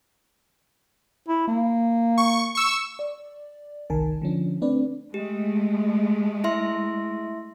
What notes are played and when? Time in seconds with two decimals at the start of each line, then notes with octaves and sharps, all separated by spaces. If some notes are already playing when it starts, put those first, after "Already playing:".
1.28 E4
1.48 A#3
2.18 C#6
2.55 C#6 E6
2.99 D5
3.90 G1 C2 D#3 A#4 G#5 A5
4.22 D3 F3 C#4 D4
4.62 A3 C4 D4 B4 D5
5.14 G#3 A3 G4
6.44 E4 E5 C6